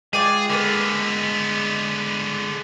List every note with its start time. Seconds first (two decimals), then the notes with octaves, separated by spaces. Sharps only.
0.13 G#3 F4 G#4 D5 G5
0.50 D3 A#3 B3 A4 B4